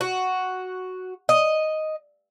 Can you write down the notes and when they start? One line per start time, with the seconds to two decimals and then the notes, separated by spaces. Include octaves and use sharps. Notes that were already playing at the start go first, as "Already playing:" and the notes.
0.01 F#4
1.29 D#5